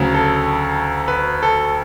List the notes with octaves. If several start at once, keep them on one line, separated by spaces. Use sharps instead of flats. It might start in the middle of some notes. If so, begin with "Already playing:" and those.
Already playing: D2 C#3 F#3
A4
B4
A4